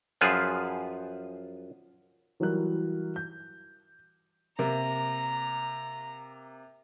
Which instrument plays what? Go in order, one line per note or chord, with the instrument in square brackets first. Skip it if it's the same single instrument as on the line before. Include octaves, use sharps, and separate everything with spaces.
[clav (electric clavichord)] F#2 F3 F4 G#4 B4 E5
[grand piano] E3 F#3 G3 E4 A#4 F#6
G6
[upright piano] C3 A#3 A#4 [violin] A#5